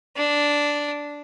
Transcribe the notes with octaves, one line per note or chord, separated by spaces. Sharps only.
D4